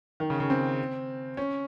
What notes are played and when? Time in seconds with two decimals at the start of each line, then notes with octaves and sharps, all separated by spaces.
0.20 D#3
0.30 C#3
0.40 C#3
0.50 C4
1.37 C#4